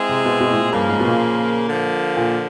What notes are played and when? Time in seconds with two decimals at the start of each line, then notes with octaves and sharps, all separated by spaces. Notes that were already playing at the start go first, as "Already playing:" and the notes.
Already playing: G#3 C4 E4 G#4
0.09 C3
0.25 B2
0.40 B2
0.51 A2
0.57 A#2
0.73 G2 C#3 F3 A#3
0.89 G#2
1.00 B2
1.05 A#2
1.69 D3 F3 A#3
2.17 A#2